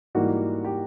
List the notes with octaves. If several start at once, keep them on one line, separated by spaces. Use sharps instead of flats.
G#2 E3 G3 A#3 F#4
G4